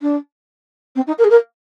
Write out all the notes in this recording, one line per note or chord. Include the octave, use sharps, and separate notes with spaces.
D4
C4
D#4
A#4
G#4
A#4